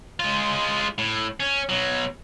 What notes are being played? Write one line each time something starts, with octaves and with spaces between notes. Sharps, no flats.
G#3 F4
A2
C#4
B2 F#3